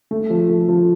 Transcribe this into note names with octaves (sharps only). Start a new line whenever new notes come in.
A3
F3
A3
F3